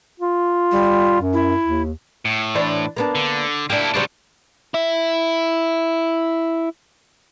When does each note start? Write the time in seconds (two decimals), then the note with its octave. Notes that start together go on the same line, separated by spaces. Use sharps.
0.20 F4
0.72 G3
1.21 F#2
1.33 E4
1.63 D#2
2.25 A2
2.55 E3 D4 C5
2.97 A#3 B3 D4
3.15 D3
3.70 A#3 D4 E4 G4
3.94 C#3 F#3 G3 C4 D4
4.74 E4 E5